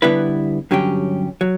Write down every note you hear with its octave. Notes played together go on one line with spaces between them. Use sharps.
D3 G3 B3 E4 B4
G2 D3 F#3 C#4 G4
F#3